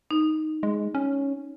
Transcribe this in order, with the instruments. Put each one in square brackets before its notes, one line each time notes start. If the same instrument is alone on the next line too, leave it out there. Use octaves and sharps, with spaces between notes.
[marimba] D#4
[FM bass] G#3
C#4